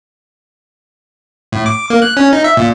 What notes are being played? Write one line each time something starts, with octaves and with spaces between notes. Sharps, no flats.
A2
D6
A#3
F#6
C#4
D#4
E5
A#2